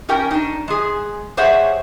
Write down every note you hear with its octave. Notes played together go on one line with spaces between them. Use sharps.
C#4 G4 A#4 G5
D4 D#4
G#3 G#4
G4 G#4 C5 C#5 E5 F#5